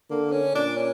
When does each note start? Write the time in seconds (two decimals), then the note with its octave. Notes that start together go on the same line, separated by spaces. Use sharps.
0.10 D3 A#3
0.32 C#4
0.55 A#2 D4
0.77 C#4